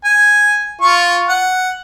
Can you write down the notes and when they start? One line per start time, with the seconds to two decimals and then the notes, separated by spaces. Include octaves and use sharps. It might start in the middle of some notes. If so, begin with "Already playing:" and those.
0.04 G#5
0.81 F4 F5 C#6
1.29 F#5